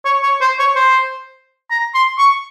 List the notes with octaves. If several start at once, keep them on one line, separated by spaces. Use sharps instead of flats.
C#5
C#5
C5
C#5
C5
A#5
C6
C#6